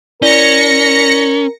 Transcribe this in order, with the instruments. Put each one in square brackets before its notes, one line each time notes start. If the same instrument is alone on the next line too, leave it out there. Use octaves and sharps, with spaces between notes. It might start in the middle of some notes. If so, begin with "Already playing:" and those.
[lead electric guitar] C#4 [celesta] E4 D5 G7 [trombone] A#4 [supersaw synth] A#6 C#7